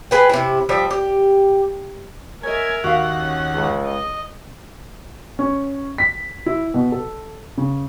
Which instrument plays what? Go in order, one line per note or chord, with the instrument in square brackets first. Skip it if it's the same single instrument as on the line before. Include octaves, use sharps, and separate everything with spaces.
[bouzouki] G#4 B4 G5
C3 E4
F3 G3 E5
G4
[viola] A#4 E5 [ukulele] C#5 D#5 [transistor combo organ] G#5
[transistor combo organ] D#2 F#5 [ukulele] F#4 F5
[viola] C#4
[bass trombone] C#2
[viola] D#5
[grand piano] C#4
B6
E4
B2
A4
C#3